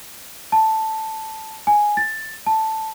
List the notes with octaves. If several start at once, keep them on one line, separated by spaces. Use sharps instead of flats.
A5
G#5
A6
A5